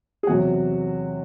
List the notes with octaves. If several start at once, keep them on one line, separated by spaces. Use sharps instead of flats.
G#4
E2 C3 F#3 F#4